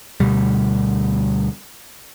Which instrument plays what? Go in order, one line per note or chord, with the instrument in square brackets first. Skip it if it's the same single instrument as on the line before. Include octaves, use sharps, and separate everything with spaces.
[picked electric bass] D2 B2 G3